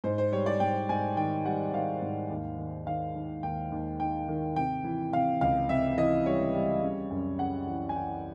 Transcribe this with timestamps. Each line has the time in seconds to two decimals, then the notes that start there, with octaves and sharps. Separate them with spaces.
0.04 G#2 C5
0.18 C5
0.32 G3 C#5
0.46 D5
0.60 G#2 G5
0.89 G#2 G#5
1.17 D#3 G5
1.45 G3 F#5
1.74 D#3 F5
2.02 G#2
2.30 D#2
2.58 D#3
2.87 D#3 F5
3.15 D#3
3.43 D#2 G5
3.72 D#2
4.00 D#3 G5
4.28 D#3
4.56 C3 G5
4.84 E3
5.13 C3 F5
5.41 C#2 F5
5.69 C3 E5
5.98 E3 D#5
6.26 G3 C#5
6.54 G3
6.83 C#3
7.10 F#2
7.39 C#3 F#5
7.67 E3
7.89 G#5
7.95 E3 G5